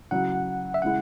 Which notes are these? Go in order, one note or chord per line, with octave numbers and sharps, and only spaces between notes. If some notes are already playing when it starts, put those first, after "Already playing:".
C#3 F#3 E4 F#5
E5
C#3 G#3 E4 F#5